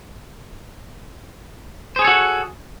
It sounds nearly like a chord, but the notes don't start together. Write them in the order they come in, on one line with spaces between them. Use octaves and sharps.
C5 G#4 C#5 A4 F#4